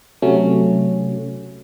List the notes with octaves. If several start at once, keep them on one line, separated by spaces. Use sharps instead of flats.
C3 F#3 A3 C#4